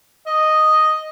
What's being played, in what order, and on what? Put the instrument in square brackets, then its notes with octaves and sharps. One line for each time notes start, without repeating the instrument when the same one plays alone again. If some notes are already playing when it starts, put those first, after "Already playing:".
[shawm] D#5